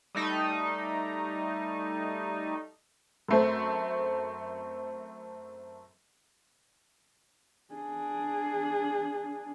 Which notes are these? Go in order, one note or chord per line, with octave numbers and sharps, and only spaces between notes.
G3 A3 D#4
F#2 A3 C4
D4 G#4